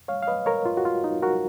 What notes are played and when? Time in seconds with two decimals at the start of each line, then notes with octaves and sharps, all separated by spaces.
0.08 C#5 F5
0.22 F5
0.27 B4 D#5
0.46 A#4 C#5
0.66 F4
0.77 F#4
0.85 F4
1.04 D#4
1.23 F#4 A#4